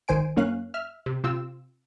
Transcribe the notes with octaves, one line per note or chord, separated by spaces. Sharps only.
G#1 D#3 C5 G#5 D7
F#2 A#3 C#4 F5 F#6
E5 F6
C3
C3 C4 F4 E6